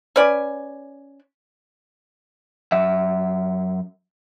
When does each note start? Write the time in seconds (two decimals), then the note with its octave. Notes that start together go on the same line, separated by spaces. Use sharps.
0.16 C#4 B4 D5 G#5
2.72 F#2 E5